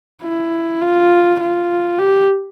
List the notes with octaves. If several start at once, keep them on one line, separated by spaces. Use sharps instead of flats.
E4
F4
F4
G4